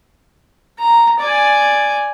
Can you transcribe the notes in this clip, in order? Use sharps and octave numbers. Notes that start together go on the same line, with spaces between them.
A#5
D5 G#5